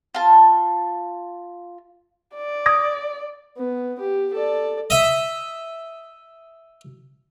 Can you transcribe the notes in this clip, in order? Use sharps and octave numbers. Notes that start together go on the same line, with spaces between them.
F4 A5
D5
D#6 G#6 A#6
B3
G4
A4 D5
D#5 E5